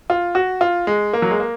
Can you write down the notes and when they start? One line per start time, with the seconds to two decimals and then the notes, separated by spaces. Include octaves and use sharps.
0.10 F4
0.35 F#4
0.61 F4
0.87 G#3
1.13 A#3
1.22 F#3
1.31 G#3
1.39 A#3